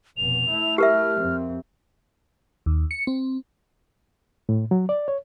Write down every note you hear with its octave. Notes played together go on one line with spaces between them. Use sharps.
F1 B2 F7
A3 E4
G4 A#4 E5 F6
F2 C4
D#2
C#7
C4
A2
F#3
D5
C#5